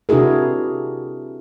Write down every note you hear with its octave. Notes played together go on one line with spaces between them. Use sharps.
C3 D4 E4 F#4 G#4 A#4